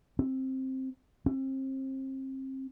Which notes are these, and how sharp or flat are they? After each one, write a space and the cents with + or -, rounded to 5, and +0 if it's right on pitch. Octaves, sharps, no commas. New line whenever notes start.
C4 +10
C4 +30